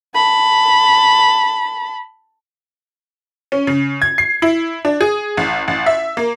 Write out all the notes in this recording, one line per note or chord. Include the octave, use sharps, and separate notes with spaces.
A5 B5
C#4
C#3
G#6
C7
E4
D4
G#4
A1
A1
E5
A#3